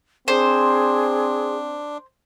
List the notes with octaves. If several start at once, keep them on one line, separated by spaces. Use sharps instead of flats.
C4 D4 G#4 C5